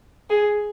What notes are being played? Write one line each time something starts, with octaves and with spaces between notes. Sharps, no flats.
G#4